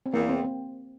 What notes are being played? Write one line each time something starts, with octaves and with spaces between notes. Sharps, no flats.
C4
E2 A#3
C4
C4